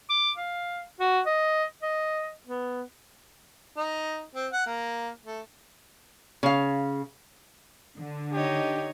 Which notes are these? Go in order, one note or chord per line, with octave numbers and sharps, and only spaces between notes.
D6
F5
F#4
D#5
D#5
B3
D#4
C4
F#5
A#3
A3
C#3 F5
D3
D#4 G4 C#5 D#5